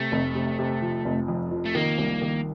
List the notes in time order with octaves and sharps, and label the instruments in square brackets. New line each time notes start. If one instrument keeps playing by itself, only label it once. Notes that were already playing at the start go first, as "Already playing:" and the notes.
Already playing: [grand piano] C3 [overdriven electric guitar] A3
[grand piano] F1
C3
C3
F3
F1
F2
F3
[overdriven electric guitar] A3
[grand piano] D#3 [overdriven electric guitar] A#3
[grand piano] C2
D#3